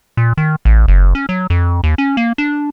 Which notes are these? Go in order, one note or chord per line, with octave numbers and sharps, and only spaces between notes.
A#2
D#3
A1
F#1
C#4
F#3
F2
D#2
C#4
A#3
D4